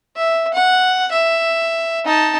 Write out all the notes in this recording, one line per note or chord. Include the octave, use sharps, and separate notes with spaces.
E5
F#5
E5
D#4 A5